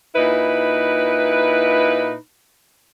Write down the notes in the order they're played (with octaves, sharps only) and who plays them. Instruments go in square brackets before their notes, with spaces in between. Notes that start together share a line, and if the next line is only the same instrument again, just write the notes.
[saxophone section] A#2 D#4 E4 B4